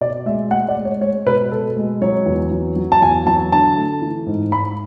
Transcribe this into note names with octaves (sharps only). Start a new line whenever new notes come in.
B2 D5
G#3 E5
G#3 F#5
D5
G#3
C#5
G#3 C#5
B2 B4
B2 A4
G#3
F#3 C#5
E2
F#3
F#3
A5
E2 G#5
F#3 A5
D3 A5
A3
E3
G#2
G#2 B5